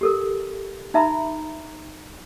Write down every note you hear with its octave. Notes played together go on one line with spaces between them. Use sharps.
G4 A4 A#4
D#4 E5 A#5 B5